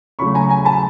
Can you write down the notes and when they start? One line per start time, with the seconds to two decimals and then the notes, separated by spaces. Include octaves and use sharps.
0.19 C#3 F#3 A3 B5 C#6
0.35 G#5 A#5
0.49 G#5 A#5
0.65 A5 B5